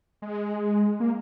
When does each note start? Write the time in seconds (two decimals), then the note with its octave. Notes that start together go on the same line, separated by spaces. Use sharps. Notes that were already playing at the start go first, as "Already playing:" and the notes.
0.22 G#3
1.00 A#3